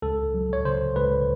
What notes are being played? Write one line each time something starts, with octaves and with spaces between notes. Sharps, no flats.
C#2 A4
F#3
C#5
C#3 C5
C#2 B4